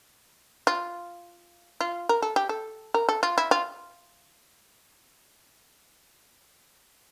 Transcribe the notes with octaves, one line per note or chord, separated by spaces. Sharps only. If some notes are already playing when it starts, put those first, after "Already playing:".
F4
F4
A#4
A4
G4
A4
A#4
A4
F4
E4
F4